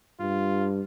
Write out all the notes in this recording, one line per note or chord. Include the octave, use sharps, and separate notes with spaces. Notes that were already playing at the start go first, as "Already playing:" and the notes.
G2 F4